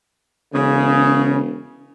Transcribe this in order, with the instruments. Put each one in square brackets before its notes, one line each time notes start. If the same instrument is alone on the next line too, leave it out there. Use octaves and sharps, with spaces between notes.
[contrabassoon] E1 [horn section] C#3